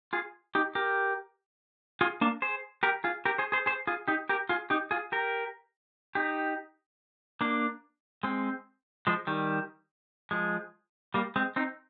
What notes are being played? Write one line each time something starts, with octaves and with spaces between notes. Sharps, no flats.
F4 G#4
D#4 G4
G4 A#4
F4 G#4
A#3 D4
G#4 C5
G4 A#4
F4 G#4
G4 A#4
G#4 C5
G#4 C5
G#4 C5
F4 G#4
D#4 G4
G4 A#4
F4 G#4
D#4 G4
F4 G#4
G4 A#4
D#4 G4
A#3 D4
G#3 C4
F3 G#3
D#3 G3
F3 G#3
G3 A#3
G#3 C4
C4 D#4